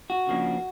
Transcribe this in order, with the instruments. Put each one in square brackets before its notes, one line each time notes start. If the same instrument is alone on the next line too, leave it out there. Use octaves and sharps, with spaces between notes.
[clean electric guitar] F#4
C#3 F3 A#3 D4